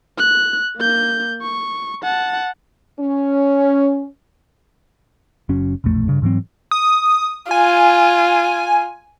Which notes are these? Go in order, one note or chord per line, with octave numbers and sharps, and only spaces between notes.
F#6
A#3 G6
C#6
F#5 A5
C#4
F#1 F#3 C#4
E1 A#1 F2 A3
G2 C#3
G#2 E3 F#3 C4
D#6
F4 G#5